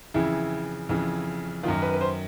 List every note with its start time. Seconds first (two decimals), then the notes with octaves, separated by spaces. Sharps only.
0.14 F2 C#3 E3 E4
0.89 F2 C#3 E3
1.63 F#2 D#3 F4
1.82 B4
1.94 B4
2.01 C5